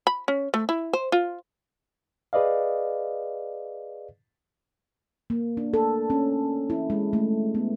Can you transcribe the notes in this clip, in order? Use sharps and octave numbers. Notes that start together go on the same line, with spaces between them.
B5
C#4
A3
E4
C5
F4
G#4 B4 D5 D#5 F5
A#3
D4
A4
C#4
E4
G#3
A3
B3